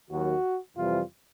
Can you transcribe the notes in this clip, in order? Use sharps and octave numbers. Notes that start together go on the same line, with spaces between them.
D#2 D#3 F#3 F#4
F2 C3 E3 G3 F4